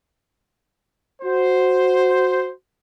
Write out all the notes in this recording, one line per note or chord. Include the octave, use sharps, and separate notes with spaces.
F#4 C5